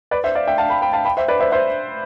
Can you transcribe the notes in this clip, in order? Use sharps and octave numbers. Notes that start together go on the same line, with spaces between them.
B4 D5
C5 E5
D5 F5
E5 G5
F5 A5
G5 B5
G5 B5
F5 A5
G5 B5
C5 E5
B4 D5
C5 E5
C5 E5